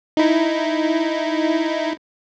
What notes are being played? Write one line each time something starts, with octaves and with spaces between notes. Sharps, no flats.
D#4 E4